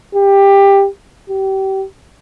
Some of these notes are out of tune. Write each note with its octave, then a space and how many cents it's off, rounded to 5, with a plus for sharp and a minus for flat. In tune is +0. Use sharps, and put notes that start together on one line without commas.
G4 +15
G4 -30